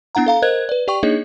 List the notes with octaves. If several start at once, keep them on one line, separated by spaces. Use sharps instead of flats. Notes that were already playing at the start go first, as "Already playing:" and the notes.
B3 D4 E4 F#5 A#5
A4 F5 A#5
A#4 C5 D#5 F#6 G#6
B4 D5
G4 D5 G5 C#6
A#3 D4 D#4 G#4 C#5 D#5